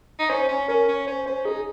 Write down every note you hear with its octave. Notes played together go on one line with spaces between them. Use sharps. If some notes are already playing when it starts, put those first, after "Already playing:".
D#4
C#4 C5
C#4
C#4 A#4
C#4
C#4 C5
C#4 C5
D#4 G#4